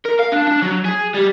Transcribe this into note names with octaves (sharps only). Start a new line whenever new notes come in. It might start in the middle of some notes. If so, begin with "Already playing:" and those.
A#4
F5
D4
D4
F#3
G#4
G3